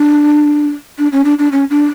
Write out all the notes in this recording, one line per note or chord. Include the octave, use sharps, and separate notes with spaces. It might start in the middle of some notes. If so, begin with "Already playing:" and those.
Already playing: D4
D4
C#4
D4
D4
C#4
D4